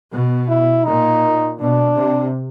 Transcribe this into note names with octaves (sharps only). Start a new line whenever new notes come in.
B2
E4
A#2 D#4
B2 D4
C3